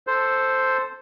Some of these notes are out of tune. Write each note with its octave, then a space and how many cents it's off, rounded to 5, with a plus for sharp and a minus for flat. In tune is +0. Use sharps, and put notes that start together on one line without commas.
A4 +0 C5 +0